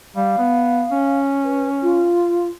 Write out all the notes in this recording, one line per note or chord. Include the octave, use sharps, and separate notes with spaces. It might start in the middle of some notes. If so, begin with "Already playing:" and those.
G3 F5
B3
C#4
B4
F4